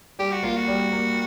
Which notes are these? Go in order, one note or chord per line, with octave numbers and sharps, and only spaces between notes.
G3 G4
F#4
A#3 F4
F#4
G3
A#3